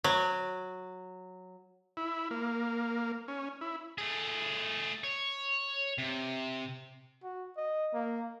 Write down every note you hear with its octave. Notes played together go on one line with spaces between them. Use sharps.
F#3
E4
A#3
C#4
E4
A3 G#4
C#5
C3
F#4
D#5
A#3